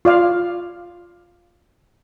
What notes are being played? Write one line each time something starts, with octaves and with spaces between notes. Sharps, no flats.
F4 D5 F5